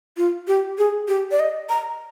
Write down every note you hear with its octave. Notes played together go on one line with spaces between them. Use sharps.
F4
G4
G#4
G4
D5
D#5
A#5